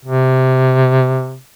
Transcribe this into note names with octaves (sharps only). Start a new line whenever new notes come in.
C3